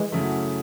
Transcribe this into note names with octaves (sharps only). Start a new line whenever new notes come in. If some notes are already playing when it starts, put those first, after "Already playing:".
Already playing: E3 G#3
F#2 C#3 F#3 A3 E4